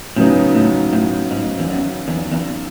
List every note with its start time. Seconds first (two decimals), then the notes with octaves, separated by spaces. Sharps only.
0.16 A2 C#3 F#3 B3 D#4
0.55 A2
0.93 A2
1.31 G#2
1.59 E2
1.69 F#2
2.08 E2
2.31 E2